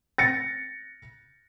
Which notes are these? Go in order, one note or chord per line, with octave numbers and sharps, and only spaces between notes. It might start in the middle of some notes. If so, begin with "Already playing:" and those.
A6 A#6 C#7